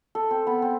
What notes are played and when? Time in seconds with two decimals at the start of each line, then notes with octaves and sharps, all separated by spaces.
0.15 A4
0.31 C4
0.47 B3
0.62 C4